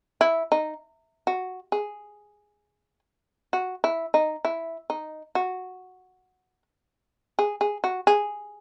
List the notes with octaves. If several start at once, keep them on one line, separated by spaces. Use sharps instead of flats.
E4
D#4
F#4
G#4
F#4
E4
D#4
E4
D#4
F#4
G#4
G#4
F#4
G#4